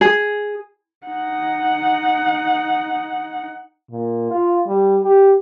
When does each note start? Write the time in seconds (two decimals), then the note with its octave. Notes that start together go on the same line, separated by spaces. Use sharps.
0.01 G#4
1.07 D#4 F#5
3.91 A#2
4.31 F4
4.67 G3
5.04 G4